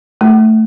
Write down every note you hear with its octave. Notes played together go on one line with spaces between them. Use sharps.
A3